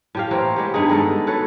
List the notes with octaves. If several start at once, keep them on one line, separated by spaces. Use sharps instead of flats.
A2 G4 F5
E3 A#3 C4 C#5
G#3 B3 G4
G2 B3 D#4 G#4
D#3 G#3 D#4 A4
F#4 A4 B4 C#5